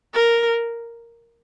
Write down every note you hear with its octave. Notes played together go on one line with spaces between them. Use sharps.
A#4